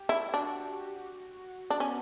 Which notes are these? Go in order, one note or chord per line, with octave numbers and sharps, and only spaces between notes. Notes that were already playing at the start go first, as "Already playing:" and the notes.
Already playing: G4
E4
D4 F#4
D4
B3 C#4